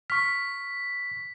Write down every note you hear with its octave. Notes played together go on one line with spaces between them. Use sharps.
C#6 F6 B6